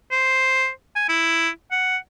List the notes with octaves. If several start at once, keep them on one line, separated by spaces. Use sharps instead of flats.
C5
G#5
E4
F#5